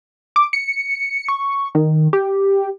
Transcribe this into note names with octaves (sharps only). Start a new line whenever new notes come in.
D6
C#7
C#6
D#3
G4